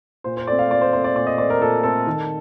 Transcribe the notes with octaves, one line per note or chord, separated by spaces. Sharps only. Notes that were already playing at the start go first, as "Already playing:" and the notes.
A#2 C5
C5
A3 C4 D5
F5
A#2 D5
C5
A3 C4 C5
D5
A#2 D5
D#5
A3 C4 D5
A#4
A#2 A4
A3 C4 A4
D#3